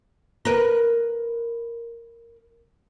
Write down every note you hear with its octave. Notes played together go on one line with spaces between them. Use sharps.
A#4 B4